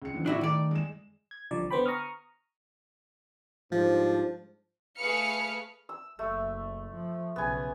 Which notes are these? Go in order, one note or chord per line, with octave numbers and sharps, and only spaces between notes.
C#2 C#7
D3 E3 C4
A2 D4 E4 F#4
D#3 A3 D5
G#3 E7
G#6
C2 D3 F3 D5
D3 B3 C5 G5 B5
A#5 C#6 D#6 F6
G#2 F3 G3 D4 C5
A3 G#4 B4 F5 F6 C#7
E6
F#1 A3
F3
B1 C#3 B3 G#5